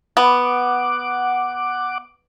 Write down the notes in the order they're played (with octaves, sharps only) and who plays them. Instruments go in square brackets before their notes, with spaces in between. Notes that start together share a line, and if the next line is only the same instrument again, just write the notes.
[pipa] B3 [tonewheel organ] F#5 D6